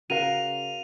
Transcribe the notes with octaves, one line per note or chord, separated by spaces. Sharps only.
C#3 F#4 A#4 F5 D#7 F7